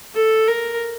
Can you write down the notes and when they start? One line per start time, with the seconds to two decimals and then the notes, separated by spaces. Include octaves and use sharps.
0.15 A4
0.47 A#4